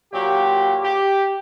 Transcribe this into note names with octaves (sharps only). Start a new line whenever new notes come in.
A#2 F#3 G4
G4